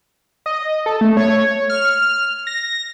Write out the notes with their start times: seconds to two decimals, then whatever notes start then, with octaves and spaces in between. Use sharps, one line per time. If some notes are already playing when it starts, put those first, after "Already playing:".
0.46 D#5
0.86 A4
1.01 A3
1.17 C#5
1.70 F6
2.47 A#6